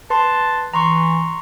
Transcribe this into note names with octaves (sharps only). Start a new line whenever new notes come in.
B4 A5 C6
E3 A#5 C6 C#6